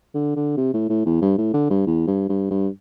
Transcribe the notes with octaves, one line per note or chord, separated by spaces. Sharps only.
D3
D3
C3
A2
A2
E2
G2
A2
D3
G2
E2
G2
G2
G2